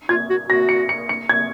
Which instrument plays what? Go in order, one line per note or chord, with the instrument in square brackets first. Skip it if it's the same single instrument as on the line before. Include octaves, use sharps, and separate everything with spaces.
[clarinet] F4 [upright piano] G#6
[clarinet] F#4
[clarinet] F#4 [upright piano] A#6
[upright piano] C#7
C#7
C#7
G#6